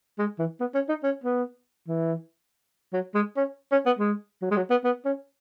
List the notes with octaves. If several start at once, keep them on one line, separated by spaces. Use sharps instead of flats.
G#3
E3
B3
C#4
D#4
C#4
B3
E3
F#3
G#3
C#4
C#4
B3
G#3
F#3
G#3
F#3
B3
B3
C#4